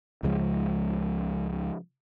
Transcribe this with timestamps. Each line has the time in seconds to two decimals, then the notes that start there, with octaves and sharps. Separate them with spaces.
0.23 C#2 C#3 F3 G#3